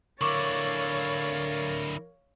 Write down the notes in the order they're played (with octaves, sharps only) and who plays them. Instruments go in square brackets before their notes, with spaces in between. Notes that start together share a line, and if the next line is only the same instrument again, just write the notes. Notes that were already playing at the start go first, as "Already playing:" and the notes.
[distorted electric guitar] D3 E4 [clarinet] A#4 [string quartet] C#5 F5 A6 [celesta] C#6 D6